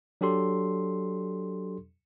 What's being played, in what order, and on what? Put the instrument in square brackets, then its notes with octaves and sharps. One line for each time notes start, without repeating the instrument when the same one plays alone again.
[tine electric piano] F#3 D4 G4 A4 C6